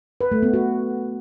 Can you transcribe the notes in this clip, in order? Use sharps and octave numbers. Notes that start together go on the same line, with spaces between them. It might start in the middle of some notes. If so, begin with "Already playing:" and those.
B4
A3
B3
F#4